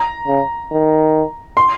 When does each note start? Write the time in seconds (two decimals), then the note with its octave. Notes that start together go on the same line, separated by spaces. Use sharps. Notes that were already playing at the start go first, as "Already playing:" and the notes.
Already playing: A#5
0.27 C#3
0.71 D#3
1.57 C6